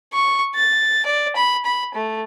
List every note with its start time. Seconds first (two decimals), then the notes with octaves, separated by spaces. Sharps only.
0.13 C#6
0.55 A6
1.06 D5
1.36 B5
1.65 B5
1.94 A3